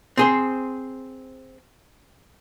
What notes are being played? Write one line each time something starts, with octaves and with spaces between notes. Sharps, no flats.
C4 G#4 C5